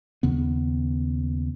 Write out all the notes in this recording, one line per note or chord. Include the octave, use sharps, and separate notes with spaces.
D#2 C#3 B3